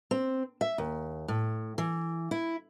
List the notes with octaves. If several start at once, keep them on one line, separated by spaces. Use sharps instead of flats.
C4
E5
D#2
A2
E3
E4